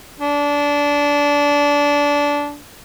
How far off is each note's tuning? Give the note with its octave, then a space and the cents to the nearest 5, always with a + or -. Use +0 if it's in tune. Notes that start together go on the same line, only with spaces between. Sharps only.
D4 -20